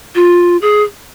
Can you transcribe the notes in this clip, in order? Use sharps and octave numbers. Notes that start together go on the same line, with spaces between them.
F4
G#4